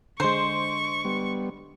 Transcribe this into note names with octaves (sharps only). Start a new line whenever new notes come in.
D3 G#3 C5 C#6
G3 B3